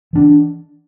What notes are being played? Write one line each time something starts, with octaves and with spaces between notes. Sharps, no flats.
E3 D4